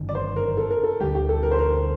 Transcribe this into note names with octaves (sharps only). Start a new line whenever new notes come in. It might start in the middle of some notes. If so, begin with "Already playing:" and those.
Already playing: G1 F#2 D#3
D5
C5
A#4
A4
A#4
A4
D2 D3 G3 G4
G4
A4
A#4
C5
A#4